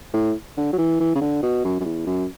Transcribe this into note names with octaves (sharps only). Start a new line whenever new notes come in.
A2
D3
F#3
E3
E3
C#3
D3
B2
F#2
F#2
E2
F#2